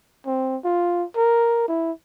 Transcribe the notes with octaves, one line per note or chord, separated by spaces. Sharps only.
C4
F4
A#4
E4